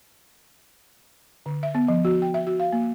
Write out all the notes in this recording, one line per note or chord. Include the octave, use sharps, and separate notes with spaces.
D3
E5
B3
F3
F#4
G5
E5
F#4
F5
A#3